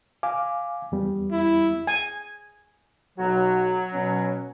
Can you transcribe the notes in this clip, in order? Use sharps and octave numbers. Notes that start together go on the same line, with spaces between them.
F5 G#5 D6
E2 G3 B3
E4
G#5
B1 F#3 F#4
B2 C#4